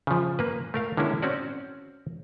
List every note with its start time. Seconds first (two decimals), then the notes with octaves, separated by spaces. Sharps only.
0.07 C#3 F3
0.39 A#3 B4
0.74 A3 A#4 F5
0.97 D3 G#3 A#3 C#4 E4
1.22 C4 C#4 F#4 D5